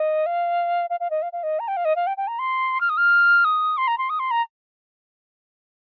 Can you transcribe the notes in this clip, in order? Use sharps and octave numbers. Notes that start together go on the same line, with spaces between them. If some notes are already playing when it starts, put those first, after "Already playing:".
Already playing: D#5
F5
F5
F5
D#5
F5
F5
D#5
A#5
G5
F5
D#5
F5
G5
G5
A#5
C6
F6
D#6
F6
D#6
C6
A#5
C6
D#6
C6
A#5